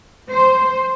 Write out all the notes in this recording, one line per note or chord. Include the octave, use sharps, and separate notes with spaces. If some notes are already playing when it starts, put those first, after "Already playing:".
C5